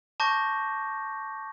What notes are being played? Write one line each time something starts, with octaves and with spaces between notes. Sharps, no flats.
A5 C#6 D6 G6 A#6